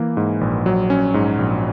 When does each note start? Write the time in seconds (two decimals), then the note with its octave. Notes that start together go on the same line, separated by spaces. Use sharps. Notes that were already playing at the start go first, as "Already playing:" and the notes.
Already playing: E3 A#3
0.17 G#2
0.41 A#1
0.66 F#3
0.90 C#4
1.14 G#2
1.39 A#1